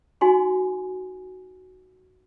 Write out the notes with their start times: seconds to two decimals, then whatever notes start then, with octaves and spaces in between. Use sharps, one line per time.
0.21 D#4 F#4 G#5 C6